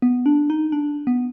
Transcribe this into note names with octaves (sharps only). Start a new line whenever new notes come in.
B3
D4
D#4
D4
B3